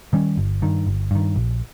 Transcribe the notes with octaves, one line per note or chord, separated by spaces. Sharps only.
D#3 G3 C#4
G1
G2 D#3
G1
G2 D#3
A#1